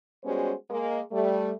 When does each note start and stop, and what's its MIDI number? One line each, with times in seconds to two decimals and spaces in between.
0.24 0.53 55
0.24 0.53 56
0.24 0.53 59
0.24 0.53 61
0.24 0.53 66
0.24 0.53 72
0.70 1.01 56
0.70 1.01 58
1.12 1.52 55
1.12 1.52 57